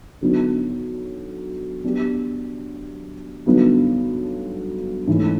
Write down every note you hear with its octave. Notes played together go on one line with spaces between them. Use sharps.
D3 F#3 B3 D#4
F#3 B3 D4 G4
G2 D3 F#3 B3 D#4
G#2 E3 A3 C#4